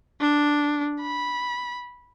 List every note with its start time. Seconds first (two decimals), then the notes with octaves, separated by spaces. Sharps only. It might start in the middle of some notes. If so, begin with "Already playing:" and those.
0.21 D4
1.02 B5